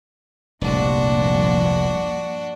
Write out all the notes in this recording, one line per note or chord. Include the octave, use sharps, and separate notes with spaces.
F1 C2 G2 A#2 F3 D4 F#4